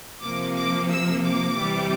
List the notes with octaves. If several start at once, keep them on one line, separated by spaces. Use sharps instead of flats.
C3 F3 A#3 D6
D6
E6
D6
C3 E3 G3